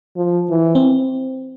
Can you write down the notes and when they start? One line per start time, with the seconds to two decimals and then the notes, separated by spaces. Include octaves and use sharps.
0.17 F3
0.50 E3
0.75 C4